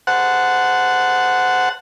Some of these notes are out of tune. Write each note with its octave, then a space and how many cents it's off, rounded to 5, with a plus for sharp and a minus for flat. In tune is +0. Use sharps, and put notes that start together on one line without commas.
C5 -25 F#5 +0 A5 +0